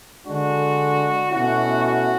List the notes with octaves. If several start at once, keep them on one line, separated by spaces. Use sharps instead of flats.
D3 G#3 D4 F#4
B2 A3 C#4 E4 F#4
F#4